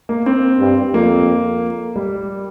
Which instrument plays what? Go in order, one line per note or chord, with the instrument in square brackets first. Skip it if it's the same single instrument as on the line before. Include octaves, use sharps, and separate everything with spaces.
[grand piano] A#3
C4
[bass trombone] G2
[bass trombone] F2 [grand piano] A#3
[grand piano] G3